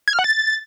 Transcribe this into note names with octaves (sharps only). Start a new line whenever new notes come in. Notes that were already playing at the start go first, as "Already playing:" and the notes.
G#6
F6
F#5
A6